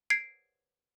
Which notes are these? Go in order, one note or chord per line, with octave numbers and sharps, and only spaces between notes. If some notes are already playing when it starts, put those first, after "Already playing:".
G#6 C7 D7